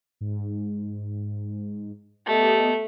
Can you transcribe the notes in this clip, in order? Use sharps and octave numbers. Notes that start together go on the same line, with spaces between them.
G#2
A3 B3 G4 D#5